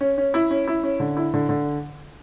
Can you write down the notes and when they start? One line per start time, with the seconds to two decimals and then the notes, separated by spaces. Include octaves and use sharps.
0.01 C#4
0.18 C#4
0.34 E4
0.51 C#4
0.68 E4
0.83 C#4
1.00 D3
1.17 E4
1.34 D3
1.49 D3